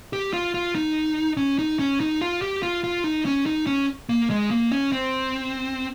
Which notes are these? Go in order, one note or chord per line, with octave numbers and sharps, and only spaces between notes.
G4
F4
F4
D#4
C#4
D#4
C#4
D#4
F4
G4
F4
F4
D#4
C#4
D#4
C#4
A#3
G#3
A#3
C#4
C4